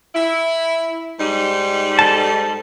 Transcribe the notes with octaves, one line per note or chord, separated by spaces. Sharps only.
E4
G#2 G3 D#4
A4 A5